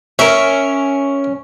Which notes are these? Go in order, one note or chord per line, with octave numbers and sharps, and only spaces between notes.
C#4 A#4 E5